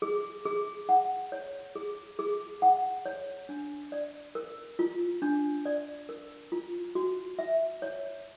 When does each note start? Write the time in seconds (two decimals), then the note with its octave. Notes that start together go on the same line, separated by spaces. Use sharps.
0.02 G#4
0.46 G#4
0.89 F#5
1.32 C#5
1.75 G#4
2.19 G#4
2.62 F#5
3.06 C#5
3.49 D4
3.92 D5
4.35 A#4
4.79 F4
5.22 D4
5.66 D5
6.09 A#4
6.52 F4
6.95 F#4
7.39 E5
7.82 C#5